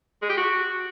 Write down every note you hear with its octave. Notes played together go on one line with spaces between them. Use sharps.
G#3
G4
F#4